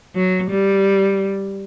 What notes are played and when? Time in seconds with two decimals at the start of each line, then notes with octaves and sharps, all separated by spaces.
0.15 F#3
0.50 G3